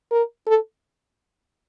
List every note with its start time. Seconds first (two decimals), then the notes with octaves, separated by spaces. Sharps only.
0.11 A#4
0.47 A4